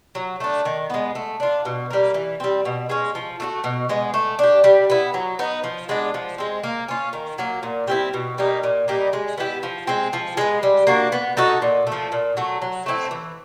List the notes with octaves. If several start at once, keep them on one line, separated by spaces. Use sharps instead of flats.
F#3
A3 D4
D#3
G#3 B3
A3
D4 F4
B2
G3 A#3
E3
G3 C4
B2
G#3 C#4
F3
A3 D4 F#4
B2
G#3 B3
A3
D4 G4
G3
B3 E4
F#3
B3 D#4
F3
G#3 B3 D4
F3
G#3 C4
A#3
C#4 F4
D#3
F#3 A#3
A#2
G3 C4 E4
B2
G3 A#3 D#4
A#2
G3 A#3 D#4
G#3
B3 E4 G4
F3
G#3 C4
F3
G#3 B3
G3
A#3 D4 F#4
B3
D#4 F#4 A4
A#2
A3
F3
A#2
F#3 A3
F#3
A3 C4 E4
E3